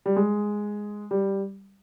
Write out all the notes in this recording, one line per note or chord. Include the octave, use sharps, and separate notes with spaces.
G3
G#3
G3